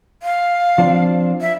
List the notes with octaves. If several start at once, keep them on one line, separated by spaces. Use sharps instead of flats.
F5
F3 C4 D4
E5